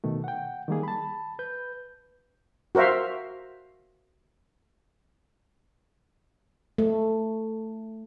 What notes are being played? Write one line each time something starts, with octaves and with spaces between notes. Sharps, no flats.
B2 D#3 A3
F#5 G5
D#3 G3 A#3 G#4
A5 B5
B4 G6
F#4 A#4 C5 E5 F5
A3